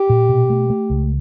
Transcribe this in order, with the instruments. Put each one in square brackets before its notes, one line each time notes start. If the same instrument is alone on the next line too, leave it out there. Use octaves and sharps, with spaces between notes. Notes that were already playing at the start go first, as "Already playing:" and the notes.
Already playing: [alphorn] G4
[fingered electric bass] A#2
B2
A3
A3
C#2